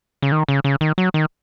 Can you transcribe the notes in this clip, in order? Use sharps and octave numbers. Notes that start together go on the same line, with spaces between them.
C#3
D#3
C#3
C#3
D#3
F#3
D#3